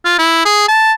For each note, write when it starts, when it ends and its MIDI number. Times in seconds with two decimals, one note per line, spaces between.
0.05 0.15 65
0.18 0.41 64
0.45 0.66 68
0.69 0.92 81